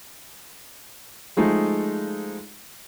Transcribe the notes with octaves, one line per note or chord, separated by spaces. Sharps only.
F3 G#3 A3 D#4